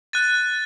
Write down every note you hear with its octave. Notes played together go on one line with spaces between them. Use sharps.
F#6 A6 D#7